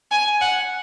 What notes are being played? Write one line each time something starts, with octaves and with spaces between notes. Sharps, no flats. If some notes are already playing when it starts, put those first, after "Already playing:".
G#5
F#5